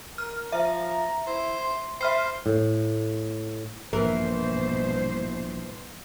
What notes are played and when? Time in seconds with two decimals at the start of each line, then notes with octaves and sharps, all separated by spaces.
0.18 A#4 F6
0.52 F3 E5 A#5
1.27 E4 C5
1.59 C6
2.01 C5 E5 B5 F6 C7
2.46 A2
3.93 A#1 G2 B2 E3 A#4 C5